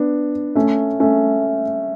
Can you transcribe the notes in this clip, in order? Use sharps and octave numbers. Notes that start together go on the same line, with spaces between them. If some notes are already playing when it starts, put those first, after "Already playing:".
Already playing: B3 D4
A3 C#4
A3 C#4